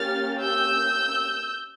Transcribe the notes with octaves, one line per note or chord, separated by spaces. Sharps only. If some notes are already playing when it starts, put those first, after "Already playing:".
Already playing: A#3 C#4 G4 F6 A6
E6 G6